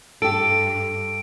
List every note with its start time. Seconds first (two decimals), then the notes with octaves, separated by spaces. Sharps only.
0.22 G2 G4 A4 D7